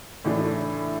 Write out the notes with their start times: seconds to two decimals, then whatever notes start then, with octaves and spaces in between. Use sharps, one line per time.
0.24 A2 E3 A3 D4 E4